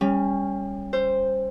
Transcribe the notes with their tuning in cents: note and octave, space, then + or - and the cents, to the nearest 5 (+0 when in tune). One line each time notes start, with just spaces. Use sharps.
G3 +25 C#4 +0
C5 +0 E6 +35